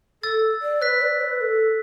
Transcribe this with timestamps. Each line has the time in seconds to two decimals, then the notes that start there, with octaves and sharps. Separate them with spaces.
0.23 A4 E6 A6
0.62 D5
0.82 B4 F#6 B6
1.02 D5
1.21 B4
1.41 A4